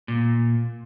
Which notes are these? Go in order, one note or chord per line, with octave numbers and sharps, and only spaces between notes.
A#2